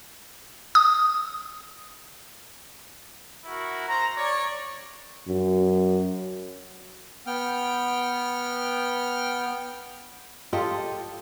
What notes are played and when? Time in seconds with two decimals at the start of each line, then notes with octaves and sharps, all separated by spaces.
0.75 D#6
3.45 E4 F#4 A#4
3.87 C5 A#5
4.17 C#5 D5
5.28 F#2
7.27 B3 G5 F6
10.53 F4 G4 A4 D#5